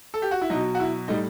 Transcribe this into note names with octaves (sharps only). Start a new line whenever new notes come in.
A4
G4
F#4
E4
B2 F#3 D#4
F#4
E4
A2 G3 D#4